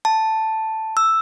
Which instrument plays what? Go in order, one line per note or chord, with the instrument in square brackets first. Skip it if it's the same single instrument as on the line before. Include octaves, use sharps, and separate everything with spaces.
[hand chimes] A5
E6